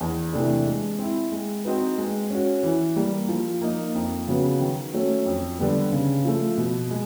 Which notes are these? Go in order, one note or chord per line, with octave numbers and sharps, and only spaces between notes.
E2
C3 E3 A3 D4
G#3
C4 E4
G#3
C4 D#4 F#4 B4
G#3
C#4 F#4
E3
G3 A#3
F3
A#3 D#4
F2
C#3 F#3 B3
D#3
F#3 A3 C#4
F2
D3 G3 B3
C#3
F3 A3
B2
G#3